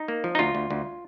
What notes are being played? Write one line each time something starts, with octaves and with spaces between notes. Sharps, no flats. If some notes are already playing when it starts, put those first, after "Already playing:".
Already playing: D#4
A#3
F3
D#4
D2 F4
D2
D2